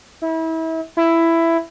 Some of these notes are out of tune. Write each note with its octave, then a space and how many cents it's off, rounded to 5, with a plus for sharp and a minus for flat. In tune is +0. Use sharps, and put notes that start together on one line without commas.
E4 -30
E4 +10